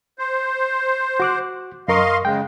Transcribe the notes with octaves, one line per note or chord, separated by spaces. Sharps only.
C5
F#4 D6 F#6
F#2 A#4 D#5 F5 C6 C#6
C#3 G#3 G5